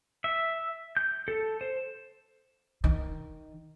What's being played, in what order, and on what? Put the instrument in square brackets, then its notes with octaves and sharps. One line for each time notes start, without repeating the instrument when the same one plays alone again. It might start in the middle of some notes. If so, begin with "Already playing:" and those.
[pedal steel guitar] E5
G6
A4
C5
[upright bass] D#3